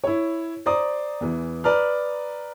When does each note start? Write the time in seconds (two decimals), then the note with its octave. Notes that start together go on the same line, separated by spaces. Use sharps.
0.04 E4 C#5
0.66 C5 D5 A#5 D#6
1.21 E2 E3
1.64 B4 D5 A#5 F6